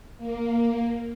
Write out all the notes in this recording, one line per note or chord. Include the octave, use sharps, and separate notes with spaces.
A#3